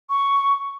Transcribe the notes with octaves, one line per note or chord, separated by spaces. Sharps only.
C#6